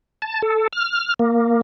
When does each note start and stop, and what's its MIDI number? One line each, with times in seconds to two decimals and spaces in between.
0.22 0.42 81
0.42 0.68 69
0.73 1.14 89
1.19 1.61 58